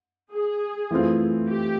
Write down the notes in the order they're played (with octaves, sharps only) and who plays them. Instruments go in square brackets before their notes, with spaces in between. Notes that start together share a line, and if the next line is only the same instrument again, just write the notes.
[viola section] G#4
[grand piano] E3 A3 C4 F4
[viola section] G4